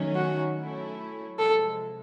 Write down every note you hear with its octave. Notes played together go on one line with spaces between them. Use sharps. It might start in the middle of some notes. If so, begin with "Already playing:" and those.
Already playing: D#3 F#3 A3 C#4
F#4
F#3 A3 C#4 E4
C3 F3 G#3 A4